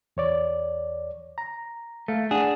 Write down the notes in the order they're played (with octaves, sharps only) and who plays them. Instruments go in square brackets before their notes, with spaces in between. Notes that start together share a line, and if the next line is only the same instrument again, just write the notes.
[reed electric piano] E2 C#5 D5
A#5
[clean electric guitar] A3 [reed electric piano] A4 F5
[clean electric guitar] D4 G#4 [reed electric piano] F#5